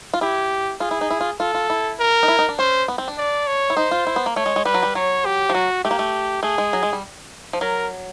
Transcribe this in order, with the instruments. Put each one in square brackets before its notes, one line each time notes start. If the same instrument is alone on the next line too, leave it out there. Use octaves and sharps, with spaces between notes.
[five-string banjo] F4
[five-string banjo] E4 [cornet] G4
[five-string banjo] F4 [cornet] G#4
[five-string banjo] E4
D#4
E4
F4
[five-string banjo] F4 [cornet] A4
[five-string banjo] F4
E4
[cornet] A#4
[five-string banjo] D#4
E4
D#4
D4
[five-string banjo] C#4 [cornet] C5
[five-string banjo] B3
C4
D4
[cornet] D5
C#5
[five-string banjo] E4
[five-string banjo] D#4 [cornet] C5
[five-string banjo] F4
E4
B3
A#3
[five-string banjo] A3 [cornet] C#5
[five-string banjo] G#3
G#3
[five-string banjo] G3 [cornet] B4
[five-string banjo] F#3
G3
[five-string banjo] F#3 [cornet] C#5
[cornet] G4
[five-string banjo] F3
[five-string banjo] F#3 [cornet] F#4
[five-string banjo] A3 [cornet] G4
[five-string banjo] A#3
A3
[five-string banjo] A3 [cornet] G#4
[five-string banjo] G#3
F#3
G#3
G3
F3
[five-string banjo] F#3 [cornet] A#4